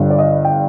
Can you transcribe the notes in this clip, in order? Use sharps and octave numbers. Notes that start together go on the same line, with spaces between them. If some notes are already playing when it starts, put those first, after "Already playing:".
Already playing: G1 G2 D3
D5
D#5
G5